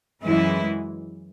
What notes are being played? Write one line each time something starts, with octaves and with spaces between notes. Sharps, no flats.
F#2 E3 G#3 E4